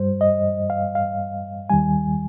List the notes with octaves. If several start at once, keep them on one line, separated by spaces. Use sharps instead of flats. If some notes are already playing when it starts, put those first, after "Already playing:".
Already playing: G2 G3 C5
D#5
F5
F5
D#2 D#3 G3 G#5